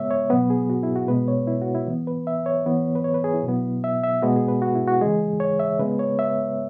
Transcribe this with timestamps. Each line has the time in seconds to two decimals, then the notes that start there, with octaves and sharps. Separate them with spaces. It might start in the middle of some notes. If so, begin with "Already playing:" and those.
Already playing: C#3 G#3 B3 C#5 E5
0.10 C#5
0.30 B2 F#3 B3 B4
0.50 G#4
0.70 F#4
0.83 E4
0.96 F#4
1.08 B2 G#3 B3 B4
1.28 C#5
1.47 E4
1.62 F#4
1.75 E4
1.87 E3 B3
2.07 B4
2.27 E5
2.46 C#5
2.66 E3 B3
2.95 B4
3.04 C#5
3.14 B4
3.24 G#4
3.34 E4
3.44 B2 F#3 B3
3.84 E5
4.04 E5
4.22 B2 G#3 B3 F#4
4.36 G#4
4.48 B4
4.62 F#4
4.75 E4
4.88 F#4
5.01 C#3 E3 G#3 G#4
5.40 C#5
5.59 E5
5.79 C#3 G#3 B3 B4
5.99 C#5
6.19 E5